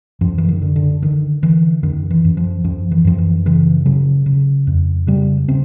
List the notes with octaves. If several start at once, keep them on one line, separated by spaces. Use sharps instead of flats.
F#2 F3
E3
D#3
D3
D3
D3 D#3
D3 E3
F#2 D#3
E3
F#2
F3
F#2 F3
E3
F#2 F3
E3
C#3 E3
C#3 F#3
C#3
F2
C#3 G3
C#3 C4